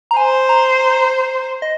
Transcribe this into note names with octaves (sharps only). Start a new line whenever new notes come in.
A#5
C5 G#5
A#5
D#5